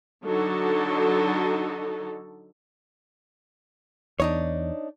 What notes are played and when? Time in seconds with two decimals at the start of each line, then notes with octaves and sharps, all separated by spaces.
0.25 D3 F#3 D#4 A4
4.20 E2 D4 D#4 C#5